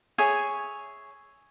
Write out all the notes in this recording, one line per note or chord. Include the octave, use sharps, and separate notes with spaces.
G#4 C#5 E5 G#5